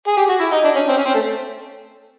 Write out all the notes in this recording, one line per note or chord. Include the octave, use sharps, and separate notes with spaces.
G#4
G4
F#4
E4
D#4
D4
C#4
C4
C#4
C4
A3